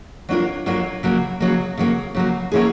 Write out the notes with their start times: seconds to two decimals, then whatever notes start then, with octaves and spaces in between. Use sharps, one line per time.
0.29 F#3 A#3 D4 F4 A#4
0.66 F#3 A#3 D4 F4 A#4
1.03 C#3 F#3 A#3
1.40 C#3 F#3 A#3
1.77 C#3 F#3 A#3
2.15 C#3 F#3 A#3
2.52 F#3 A#3 C#4 E4 G#4